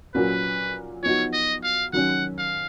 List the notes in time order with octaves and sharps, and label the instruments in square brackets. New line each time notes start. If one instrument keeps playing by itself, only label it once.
[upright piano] A#2 F#3 A#3 C#4 F#4 [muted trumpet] B4
[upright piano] F3 B3 D#4 F#4 [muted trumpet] C#5
[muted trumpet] D#5
F5
[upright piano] D#3 F#3 C#4 [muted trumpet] F#5
[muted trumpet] F5